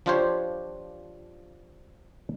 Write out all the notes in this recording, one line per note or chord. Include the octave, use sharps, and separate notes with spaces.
F3 D4 F4 G4 C5 C#5